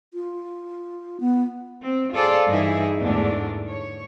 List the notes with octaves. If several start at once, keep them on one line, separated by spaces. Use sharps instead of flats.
F4
B3
C4
F4 G#4 A4 C5 D5
G2 E3 D#4 E4 G#4
E2 G#2 D3 A3 D4
C#5